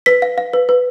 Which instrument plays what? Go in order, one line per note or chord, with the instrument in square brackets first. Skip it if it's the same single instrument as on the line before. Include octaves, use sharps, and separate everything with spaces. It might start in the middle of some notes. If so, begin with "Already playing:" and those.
[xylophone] B4 B6
F5
F5
B4
B4